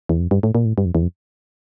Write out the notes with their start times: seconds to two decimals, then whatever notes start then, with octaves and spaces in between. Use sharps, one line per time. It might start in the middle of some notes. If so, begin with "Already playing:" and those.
0.09 E2
0.20 F2
0.31 G2
0.43 A2
0.55 A#2
0.65 A2
0.78 G2
0.85 F2
0.95 E2
1.02 F2